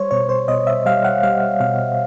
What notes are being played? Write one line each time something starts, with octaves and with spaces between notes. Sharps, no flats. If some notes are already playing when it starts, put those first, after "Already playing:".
Already playing: G3 C5 C#5
B2 C#5
C5
B2 D#5
E5
G3 F5
F#5
G3 F5
B2 F5